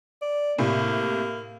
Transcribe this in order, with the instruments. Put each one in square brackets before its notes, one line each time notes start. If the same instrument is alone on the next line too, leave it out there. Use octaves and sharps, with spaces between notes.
[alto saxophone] D5
[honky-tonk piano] A2 C3 [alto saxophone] A#3